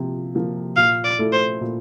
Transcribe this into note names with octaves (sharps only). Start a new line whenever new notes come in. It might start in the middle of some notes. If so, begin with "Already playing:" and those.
Already playing: C3 F3 A#3
F3 A#3
A#2 F5
D5
A3 E4 A4
C5
A#2